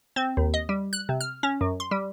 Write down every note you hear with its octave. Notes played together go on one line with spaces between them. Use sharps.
C4
D#2
D#5
G3
F#6
C3
F6
C#4
F#2
C6
G3